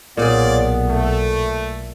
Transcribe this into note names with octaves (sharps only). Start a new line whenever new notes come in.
B1 A#2 B3 F4 G#4 C#5 D5
A3